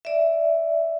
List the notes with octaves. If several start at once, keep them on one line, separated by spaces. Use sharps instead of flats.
D5 E5